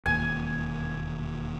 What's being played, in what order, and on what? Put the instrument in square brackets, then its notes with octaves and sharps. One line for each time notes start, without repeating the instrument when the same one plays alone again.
[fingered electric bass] E1 D#2 A#2 [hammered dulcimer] G#5